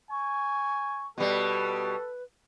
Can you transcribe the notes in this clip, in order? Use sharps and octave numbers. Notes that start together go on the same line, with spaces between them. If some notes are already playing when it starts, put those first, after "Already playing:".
G#5 C#6
B2 G3 A4 B4